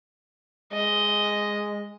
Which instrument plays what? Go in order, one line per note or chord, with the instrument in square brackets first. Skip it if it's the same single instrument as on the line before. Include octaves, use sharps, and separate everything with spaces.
[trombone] G#3 [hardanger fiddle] D#5